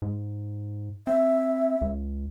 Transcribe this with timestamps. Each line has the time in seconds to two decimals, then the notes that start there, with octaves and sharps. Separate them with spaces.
0.02 G#2
1.07 C4 E5
1.81 C#2